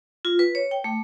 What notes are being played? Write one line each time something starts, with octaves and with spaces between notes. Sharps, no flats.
F4
B4
C#5
G5
A3